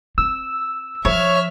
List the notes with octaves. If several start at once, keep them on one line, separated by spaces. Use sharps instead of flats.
C4 E6
F3 C#5 E5 F6